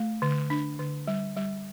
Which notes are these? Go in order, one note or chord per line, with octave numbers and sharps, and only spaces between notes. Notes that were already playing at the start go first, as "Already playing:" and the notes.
Already playing: A3
D3
D4
D3
G3
G3